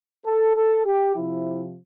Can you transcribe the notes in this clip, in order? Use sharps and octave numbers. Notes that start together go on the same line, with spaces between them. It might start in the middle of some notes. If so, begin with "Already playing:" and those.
A4
A4
G4
C3 F3 E4